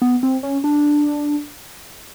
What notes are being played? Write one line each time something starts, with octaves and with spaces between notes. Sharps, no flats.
B3
C4
C#4
D4